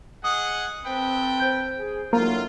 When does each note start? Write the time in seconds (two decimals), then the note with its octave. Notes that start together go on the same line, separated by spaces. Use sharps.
0.24 G#4 D#5 F#5 D#6
0.85 C4 A4 B4 G5
1.38 C5 G6 D7
1.78 G#4
2.13 D3 F#3 A#3 E4 F4